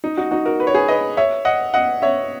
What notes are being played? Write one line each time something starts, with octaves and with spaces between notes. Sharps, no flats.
D#4
D#4 F#4
D#4 F#4
F#4 A#4
B4
C#5
G#4 B4
B4 D#5
C#5 E5
D#5 F#5
D#5 F#5
C#5 E5